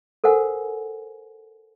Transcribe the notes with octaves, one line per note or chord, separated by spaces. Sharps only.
A4 A#4 C5 F#5 G#5